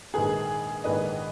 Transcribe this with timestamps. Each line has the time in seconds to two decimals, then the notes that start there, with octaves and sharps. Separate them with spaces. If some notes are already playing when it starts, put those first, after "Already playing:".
0.14 A#1 G#2 D#3 G#4 B4
0.84 A#1 G#2 D#3 B4 D#5